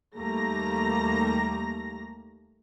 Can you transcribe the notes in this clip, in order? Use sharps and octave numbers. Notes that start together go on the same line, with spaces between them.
D#2 G3 A3 A#3 A#5 A#6